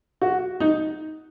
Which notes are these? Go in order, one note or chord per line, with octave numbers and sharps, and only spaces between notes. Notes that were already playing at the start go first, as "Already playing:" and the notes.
F#4
D#4